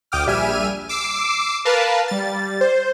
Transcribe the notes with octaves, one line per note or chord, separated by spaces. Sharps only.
D2 G5 D6 D#6 F6
A#1 G3 E5 G#5 F6 D#7
D6 E6 C7
A#4 B4 F5 A5
G3 A6
C5